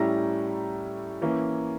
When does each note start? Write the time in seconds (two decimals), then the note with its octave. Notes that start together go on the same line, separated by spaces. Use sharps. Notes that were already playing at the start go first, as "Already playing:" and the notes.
Already playing: A2 G3 C#4 E4 A#5 A#6
1.22 E3 A#3 C#4 E4